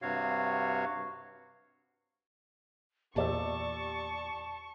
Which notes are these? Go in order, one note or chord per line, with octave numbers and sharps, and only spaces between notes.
G2 C3 F#4 C#5 F5
E2 A#2 G4 D5 A5 C#6 E6